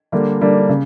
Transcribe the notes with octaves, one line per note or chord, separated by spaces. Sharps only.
D3 G3 A#3 D4
D3 G3 A#3 D4
C#3